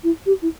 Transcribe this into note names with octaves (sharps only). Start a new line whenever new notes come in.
E4
G4
E4